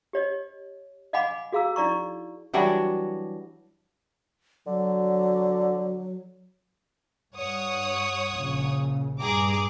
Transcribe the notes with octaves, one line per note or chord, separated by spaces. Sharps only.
G4 C#5 D#5
D#5 F5 F#5 G#5 B5 D6
F#4 G#4 F5 A#5 E6
D#4 E4 D5 A#5 C#6
E3 F#3 G3 D4
D3 F#3
G2 C#5 F#5 D#6
A#1 C#3
G2 G#4 A#5 D6